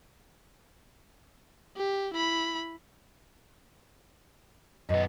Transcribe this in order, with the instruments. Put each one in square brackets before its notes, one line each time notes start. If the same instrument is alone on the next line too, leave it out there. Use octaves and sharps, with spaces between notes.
[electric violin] G4
E4 B5
[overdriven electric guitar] F#2 B3 [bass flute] D#5